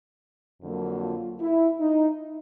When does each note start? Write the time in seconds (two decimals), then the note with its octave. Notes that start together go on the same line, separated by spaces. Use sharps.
0.61 F2 D3 F#3 A#3
1.01 F4
1.41 E4
1.80 D#4